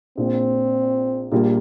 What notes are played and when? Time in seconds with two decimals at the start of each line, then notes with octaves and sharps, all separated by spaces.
0.18 A#1 A#2 A#3 C4
1.32 A#1 A#2 G3 A#3